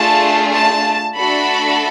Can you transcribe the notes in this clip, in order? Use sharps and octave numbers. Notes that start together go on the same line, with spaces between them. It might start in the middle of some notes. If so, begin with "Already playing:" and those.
Already playing: A3 D4 F4 G#4 A5
A5
A3 D4 F#4 A4 B5